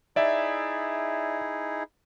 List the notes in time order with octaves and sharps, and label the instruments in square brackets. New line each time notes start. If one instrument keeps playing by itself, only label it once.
[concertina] D#4 E4 G#4 [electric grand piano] D5 E5